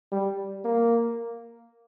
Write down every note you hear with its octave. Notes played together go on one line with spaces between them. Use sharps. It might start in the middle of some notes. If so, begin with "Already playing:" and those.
G3
A#3